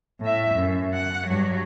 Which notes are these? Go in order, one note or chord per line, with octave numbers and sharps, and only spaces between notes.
A2 E5
F#2
F#5
G2 F#3